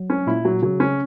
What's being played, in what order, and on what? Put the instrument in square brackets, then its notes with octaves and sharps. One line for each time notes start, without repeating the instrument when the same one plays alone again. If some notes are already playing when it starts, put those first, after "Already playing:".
Already playing: [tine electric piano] F#3
[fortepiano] C#4
[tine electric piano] A#2 [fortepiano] E4
[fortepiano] F#3
[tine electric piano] C#3 [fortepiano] F#3
[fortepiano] C#4